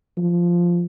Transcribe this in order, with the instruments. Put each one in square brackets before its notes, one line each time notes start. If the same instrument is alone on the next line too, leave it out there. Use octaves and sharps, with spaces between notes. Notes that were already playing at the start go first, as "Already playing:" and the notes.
[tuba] F3